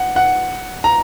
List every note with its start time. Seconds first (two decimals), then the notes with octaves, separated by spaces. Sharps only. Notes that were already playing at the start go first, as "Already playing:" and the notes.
Already playing: F#5
0.16 F#5
0.84 A#5